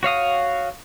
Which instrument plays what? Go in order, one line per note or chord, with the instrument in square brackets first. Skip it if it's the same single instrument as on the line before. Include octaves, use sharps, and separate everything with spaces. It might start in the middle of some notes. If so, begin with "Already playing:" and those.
[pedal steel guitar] F#4 C#5 F5 D#6